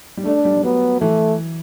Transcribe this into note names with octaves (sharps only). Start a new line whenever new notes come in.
G3
A3 D4
G3
G3
F#3 B3
E3 A3